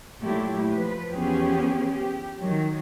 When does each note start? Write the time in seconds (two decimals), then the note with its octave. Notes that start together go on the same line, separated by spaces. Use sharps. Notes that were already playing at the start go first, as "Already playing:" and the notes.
0.20 A#2 F#3 A3 E4 G4
0.74 F3 B4
1.09 E2 F3 B3 C#4 G4 G#4
1.92 G4
2.39 D#3 F#3